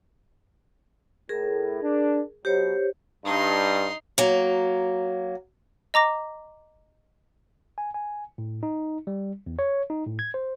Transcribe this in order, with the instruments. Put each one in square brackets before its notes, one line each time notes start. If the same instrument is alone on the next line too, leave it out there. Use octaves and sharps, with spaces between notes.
[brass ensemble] A2 [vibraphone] G#4 A#4
[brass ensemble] D4
[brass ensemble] B2 F#3 [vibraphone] G4 C5 C#5
[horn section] G2 [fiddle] D#4 C6
[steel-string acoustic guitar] F#3 A#3
[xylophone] D#5 A#5 D6 A#6
[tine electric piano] G#5
G#5
A2
D#4
G3
E2
C#5
D#4
A2
G#6
C5